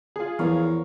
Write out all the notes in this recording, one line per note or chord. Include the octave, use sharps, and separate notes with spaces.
F4 G#4
E2 E3 F3 A#4 C#5 F5